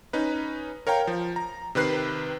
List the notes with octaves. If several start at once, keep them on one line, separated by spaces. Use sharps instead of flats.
C#4 D#4 B4
A#4 C#5 F5 G5 A#5
F3
A#5
C3 D#3 B4 F#6 C7